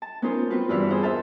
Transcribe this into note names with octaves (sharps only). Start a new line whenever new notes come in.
A5
B3 C#4 D#4 F4 A#4 C5
B3 C4 F4 F#4 B4
E2 G2 E4 B4 F5
G#4 C5 F5 F#5
A#4 C5 E5 F5 A5